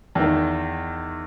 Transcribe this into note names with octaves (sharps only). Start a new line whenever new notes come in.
E2 D#3